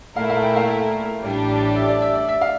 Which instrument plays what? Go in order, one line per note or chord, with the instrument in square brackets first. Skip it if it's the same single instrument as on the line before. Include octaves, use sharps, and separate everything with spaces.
[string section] A#2 A3 E4 A#4 [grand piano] F5
[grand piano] F5
G5
F5
[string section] A1 A2 G3 D4 G4
[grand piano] E5
D5
E5
D5
E5
F5